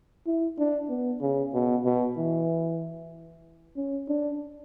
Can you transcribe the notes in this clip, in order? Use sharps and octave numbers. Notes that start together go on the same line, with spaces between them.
E4
D4
B3
C#3
B2
B2
E3
C#4
D4